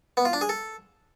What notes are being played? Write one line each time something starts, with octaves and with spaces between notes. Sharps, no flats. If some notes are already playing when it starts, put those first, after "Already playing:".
B3
F4
D4
G#4
A4